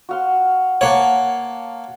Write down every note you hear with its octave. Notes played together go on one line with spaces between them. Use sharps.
F#4 F5 C6
A#3 C#5 F5 F#5 A5